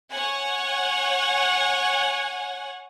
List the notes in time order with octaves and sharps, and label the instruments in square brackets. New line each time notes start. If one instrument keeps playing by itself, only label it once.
[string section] C#5 F#5 G#5